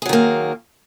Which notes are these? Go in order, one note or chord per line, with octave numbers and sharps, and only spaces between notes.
D#3 F#3 A#3 G#4